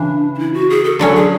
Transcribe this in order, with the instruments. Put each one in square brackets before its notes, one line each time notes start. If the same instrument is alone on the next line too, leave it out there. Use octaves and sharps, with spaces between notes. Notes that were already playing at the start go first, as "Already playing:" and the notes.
Already playing: [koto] C#3 E3 [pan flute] D4
[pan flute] D4
E4
F#4
G#4
A4
[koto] D3 F#3 C#4 [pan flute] A4
[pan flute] G#4